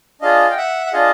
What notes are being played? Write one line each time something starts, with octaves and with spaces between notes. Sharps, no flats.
D4 F4 G#4 D#5 F5
G5
E5 F#5
F#5
D4 F4 G#4 D#5 F5